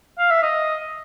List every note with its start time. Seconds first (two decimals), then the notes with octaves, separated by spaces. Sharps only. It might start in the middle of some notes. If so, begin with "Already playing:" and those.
0.19 F5
0.30 E5
0.43 D#5